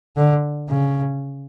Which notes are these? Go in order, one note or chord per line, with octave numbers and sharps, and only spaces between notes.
D3
C#3